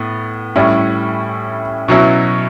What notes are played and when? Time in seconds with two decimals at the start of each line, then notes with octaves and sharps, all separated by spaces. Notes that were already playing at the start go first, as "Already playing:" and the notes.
Already playing: A2 B3
0.56 A2 G3 C#4 E4
1.88 B2 F#3 C#4 E4